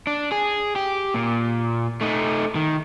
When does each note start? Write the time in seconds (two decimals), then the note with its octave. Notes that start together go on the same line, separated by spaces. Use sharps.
0.07 D4
0.32 G#4
0.76 G4
1.14 A#2
2.01 A3 D#4
2.56 D#3